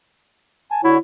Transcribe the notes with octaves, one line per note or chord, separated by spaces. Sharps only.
G#5 A5
D3 E4 F#4 C#5